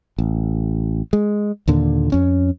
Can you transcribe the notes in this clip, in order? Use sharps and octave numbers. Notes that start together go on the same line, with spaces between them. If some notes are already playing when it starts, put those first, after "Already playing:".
A1
G#3
D#2 A#2 D3
F2 C#4